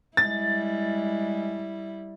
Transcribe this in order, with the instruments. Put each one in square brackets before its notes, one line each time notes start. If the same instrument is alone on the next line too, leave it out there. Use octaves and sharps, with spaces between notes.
[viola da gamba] G3 E4 [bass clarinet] G#3 [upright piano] A6